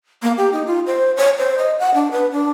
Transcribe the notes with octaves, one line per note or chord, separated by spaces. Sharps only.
A#3
G4
D#4
F4
C5
C#5
C5
D#5
F#5
D4
B4
D4